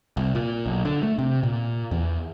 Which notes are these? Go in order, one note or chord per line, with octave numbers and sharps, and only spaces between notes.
C2
A#2
B1
D3
A3
C3
A#2
E2